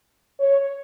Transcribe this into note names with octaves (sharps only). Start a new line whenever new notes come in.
C#5